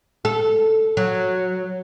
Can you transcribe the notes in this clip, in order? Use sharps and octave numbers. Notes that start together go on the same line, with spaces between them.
A4
F#3